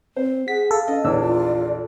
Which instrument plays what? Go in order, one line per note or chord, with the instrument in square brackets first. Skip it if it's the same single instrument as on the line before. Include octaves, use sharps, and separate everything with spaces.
[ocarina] C4 [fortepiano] C5
[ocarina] G#4 [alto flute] F#5 [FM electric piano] B6
[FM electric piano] A4 [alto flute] F5
[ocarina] C#4 [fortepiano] D#5
[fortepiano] A#1 E2 E6 [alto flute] C#5 [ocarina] D5
[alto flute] F4